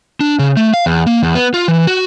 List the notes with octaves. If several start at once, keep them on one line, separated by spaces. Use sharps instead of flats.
D4
C#3
A3
F5
E2
A#3
E2
B3
F4
E3
F#4